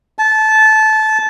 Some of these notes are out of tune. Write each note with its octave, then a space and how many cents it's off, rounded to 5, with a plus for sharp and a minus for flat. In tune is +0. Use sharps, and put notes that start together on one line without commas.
A5 -20